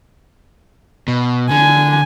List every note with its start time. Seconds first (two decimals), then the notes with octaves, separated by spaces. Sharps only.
1.08 B2
1.51 D3 G#5